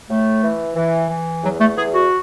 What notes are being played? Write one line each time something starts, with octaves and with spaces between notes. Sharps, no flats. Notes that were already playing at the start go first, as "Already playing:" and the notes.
A2 A3
E3
E3
E3
E2 F#3
A3
E2 G#4
F#4